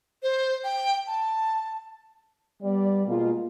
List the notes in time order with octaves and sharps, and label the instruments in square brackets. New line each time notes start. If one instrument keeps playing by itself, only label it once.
[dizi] C5
G5
A5
[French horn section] G3 B3 D5
B2 G#3 A#3 F4